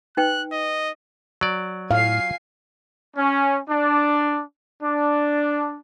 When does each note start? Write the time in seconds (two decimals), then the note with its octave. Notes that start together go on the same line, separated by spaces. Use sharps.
0.17 D#4 B4 G5 F#6
0.52 D#5
1.41 F#3 D5
1.91 A2 F5 G#5 C7
3.17 C#4
3.68 D4
4.83 D4